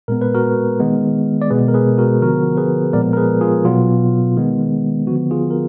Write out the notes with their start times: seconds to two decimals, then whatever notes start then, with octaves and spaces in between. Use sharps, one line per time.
0.08 A#2 G#3 B3 A#4
0.21 B4
0.34 F#4 A#4
0.80 D#3 G#3 B3
1.42 D5
1.51 B2 G#3 B3 G#4 B4
1.68 A#4
1.74 G#4 B4
1.98 F#4 A#4
2.22 D3 F3 B3 F#4 A#4
2.57 G#4 B4
2.93 A#2 F3 G#3 B3 A#4 D5
3.13 A#4
3.17 G#4 B4
3.41 F4 G#4
3.65 B2 F#3 B3 F4
4.36 D#3 G#3 B3
5.07 D3 F3 B3 F#4
5.31 F4 G#4
5.51 A#4